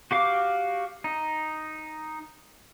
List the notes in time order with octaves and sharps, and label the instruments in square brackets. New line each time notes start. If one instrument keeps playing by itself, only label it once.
[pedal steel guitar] F#4 G4 F5 D6
D#4